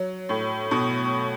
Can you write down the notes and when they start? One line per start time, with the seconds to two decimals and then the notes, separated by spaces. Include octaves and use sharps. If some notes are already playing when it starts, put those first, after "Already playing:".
Already playing: F#3
0.29 A2
0.71 B2